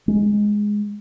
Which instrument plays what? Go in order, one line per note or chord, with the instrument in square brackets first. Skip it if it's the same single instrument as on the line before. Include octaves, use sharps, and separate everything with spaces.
[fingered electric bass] G#3